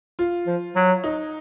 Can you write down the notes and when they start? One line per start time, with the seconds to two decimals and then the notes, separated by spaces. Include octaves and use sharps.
0.19 F4
0.47 F3
0.76 F#3
1.04 D#4